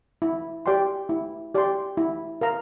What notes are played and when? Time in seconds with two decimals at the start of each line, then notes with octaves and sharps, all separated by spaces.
0.22 E4
0.66 G4 D5 G5 C6
1.09 E4
1.54 G4 D5 G5 C6
1.97 E4
2.41 A#4 F5 A#5